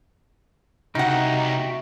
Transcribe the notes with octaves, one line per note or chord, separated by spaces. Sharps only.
C2 C#3 D#4 F#4 E5 F#5 G5